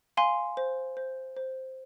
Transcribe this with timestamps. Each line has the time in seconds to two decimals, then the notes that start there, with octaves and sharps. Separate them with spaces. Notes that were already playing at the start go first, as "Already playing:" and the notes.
0.17 F5 G#5 C6
0.57 C5
0.97 C5
1.37 C5